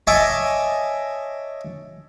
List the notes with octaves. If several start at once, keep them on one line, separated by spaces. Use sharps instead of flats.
C#5 D#5 E5 G#5 A5 D6